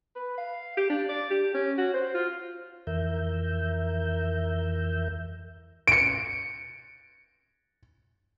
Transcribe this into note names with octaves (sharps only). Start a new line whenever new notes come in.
B4
F5
G4
D4
D5
G4
C#4
F#4
C5
F4
F2 E3 A#4 E5 G6
C#7 D7